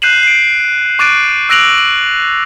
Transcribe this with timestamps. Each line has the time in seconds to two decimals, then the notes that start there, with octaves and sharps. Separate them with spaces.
0.02 F#6 G6 C7 D#7 E7 F#7
0.23 C7 D7
0.99 C#6 D6 F#6 A6 D7 D#7
1.49 E6 F#6 A#6 D7 F7 F#7
1.78 F#7